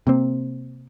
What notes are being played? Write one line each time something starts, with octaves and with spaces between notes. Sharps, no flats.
C3 A#3 C4